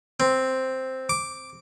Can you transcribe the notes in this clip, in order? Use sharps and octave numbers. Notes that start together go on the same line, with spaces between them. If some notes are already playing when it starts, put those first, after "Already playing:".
C4
D6